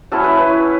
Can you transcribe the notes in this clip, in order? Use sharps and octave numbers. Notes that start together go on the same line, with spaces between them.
F#3 C#4 E4 A4
B4
B4
C#5